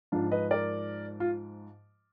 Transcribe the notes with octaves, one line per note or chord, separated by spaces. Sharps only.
G#2 F3 D4 F4
B4 D#5
A#4 D5
F4